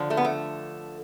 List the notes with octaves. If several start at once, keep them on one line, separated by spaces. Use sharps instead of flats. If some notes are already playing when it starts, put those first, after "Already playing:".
Already playing: D3 F3
A3
B3
A3